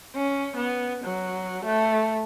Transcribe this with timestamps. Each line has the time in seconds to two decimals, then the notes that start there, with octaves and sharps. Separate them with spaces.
0.15 C#4
0.56 B3
1.04 F#3
1.65 A3